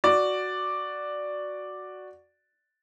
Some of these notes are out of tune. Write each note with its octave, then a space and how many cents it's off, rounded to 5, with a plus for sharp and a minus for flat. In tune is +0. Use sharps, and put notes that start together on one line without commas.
F#4 +0 D5 +0